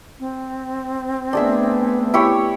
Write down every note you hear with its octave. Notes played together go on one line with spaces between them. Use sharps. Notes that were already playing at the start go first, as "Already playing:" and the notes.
C4
A3 B3 D4 G#4 E5
E4 G4 C#5